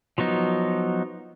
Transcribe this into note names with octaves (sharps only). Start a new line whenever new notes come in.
F3 F#3 B3 D#4